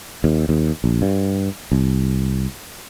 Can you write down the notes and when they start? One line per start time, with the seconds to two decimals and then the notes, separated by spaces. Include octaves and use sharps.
0.24 D#2
0.49 D#2
0.84 A#1
1.02 G2
1.72 C2